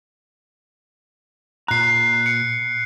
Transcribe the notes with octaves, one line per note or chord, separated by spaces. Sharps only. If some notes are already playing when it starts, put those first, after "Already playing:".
A#2 A#5 F#6 C7
C#7